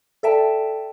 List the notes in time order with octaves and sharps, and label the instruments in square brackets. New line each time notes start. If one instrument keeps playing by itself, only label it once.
[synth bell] A4 D5 E5 G5 A5